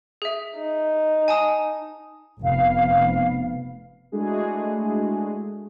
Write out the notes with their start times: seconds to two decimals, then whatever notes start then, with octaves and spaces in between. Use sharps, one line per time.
0.22 G#4 E5
0.58 D#4
1.28 G#5 A5 D#6
2.43 F1 B3 F5
4.12 G#3 A3 D4 E4 F#4 G#4